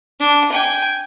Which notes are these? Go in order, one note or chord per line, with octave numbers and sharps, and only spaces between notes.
D4
G5 G#5